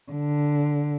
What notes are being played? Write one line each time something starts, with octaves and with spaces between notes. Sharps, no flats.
D3